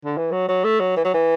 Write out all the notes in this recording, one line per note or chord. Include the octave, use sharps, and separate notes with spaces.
D3
E3
F#3
F#3
A3
F#3
E3
F#3
E3